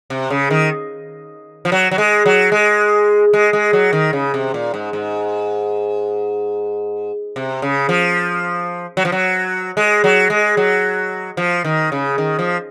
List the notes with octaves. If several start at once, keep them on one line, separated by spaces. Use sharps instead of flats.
C3
C#3
D#3
F3
F#3
F#3
G#3
F#3
G#3
G#3
G#3
F#3
D#3
C#3
C3
A#2
G#2
G#2
C3
C#3
F3
F#3
F3
F#3
G#3
F#3
G#3
F#3
F3
D#3
C#3
D#3
F3